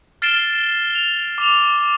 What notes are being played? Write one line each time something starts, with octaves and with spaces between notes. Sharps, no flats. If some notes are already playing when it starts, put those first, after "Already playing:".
F6 A6 C7 D7 E7 G7
F7
D6 F7